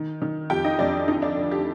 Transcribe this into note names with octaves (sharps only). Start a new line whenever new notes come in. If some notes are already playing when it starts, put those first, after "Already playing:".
Already playing: D#3
D#3
F2 G4 G5
D#4 D#5
F2 D4 D5
D2 D#4 D#5
D4 D5
D2
G4